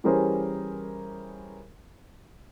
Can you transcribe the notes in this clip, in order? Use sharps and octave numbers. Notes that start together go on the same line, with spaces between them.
E3 G3 C#4 G#4 A#4 C5